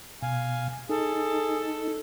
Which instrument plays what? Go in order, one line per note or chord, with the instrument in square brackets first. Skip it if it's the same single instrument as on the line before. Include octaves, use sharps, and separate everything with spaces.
[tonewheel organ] B2 [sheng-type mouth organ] F5 G#5
[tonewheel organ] D#4 [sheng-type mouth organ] G#4 [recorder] A4